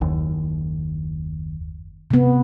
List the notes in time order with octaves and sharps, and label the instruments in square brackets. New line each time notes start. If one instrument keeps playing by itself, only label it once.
[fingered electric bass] F#1 D#2
[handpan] C3 B3